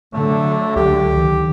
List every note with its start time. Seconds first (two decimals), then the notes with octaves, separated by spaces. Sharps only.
0.13 D3 F#3 A3
0.76 C#2 G4
1.17 D#3